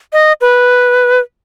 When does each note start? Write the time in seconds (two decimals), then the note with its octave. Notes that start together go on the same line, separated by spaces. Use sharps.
0.13 D#5
0.41 B4